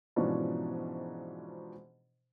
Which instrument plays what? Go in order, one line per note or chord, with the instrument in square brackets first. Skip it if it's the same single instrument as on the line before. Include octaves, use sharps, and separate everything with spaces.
[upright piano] G#2 B2 E3 F3 C#4 D4